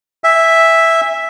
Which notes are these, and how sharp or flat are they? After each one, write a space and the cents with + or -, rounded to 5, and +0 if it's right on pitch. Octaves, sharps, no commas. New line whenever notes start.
E5 +0 G#5 -30